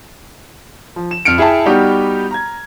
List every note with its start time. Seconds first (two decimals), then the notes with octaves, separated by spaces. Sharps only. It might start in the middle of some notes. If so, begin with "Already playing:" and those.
0.96 F3
1.11 E7
1.25 F2 F6 C#7 D7
1.38 E4 G#4 E5 G5 A5
1.65 G3 B3 D#4 F#4 G4
2.31 A#5 G#6